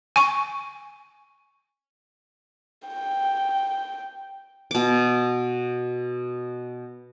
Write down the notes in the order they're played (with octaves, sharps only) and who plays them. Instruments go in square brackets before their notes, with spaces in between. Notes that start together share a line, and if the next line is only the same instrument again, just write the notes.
[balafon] G#5 C#6
[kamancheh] G5
[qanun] B2 D6